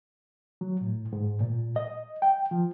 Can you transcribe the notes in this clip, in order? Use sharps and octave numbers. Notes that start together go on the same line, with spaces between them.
F#3
A2
G#2
A#2
D#5
G5
F3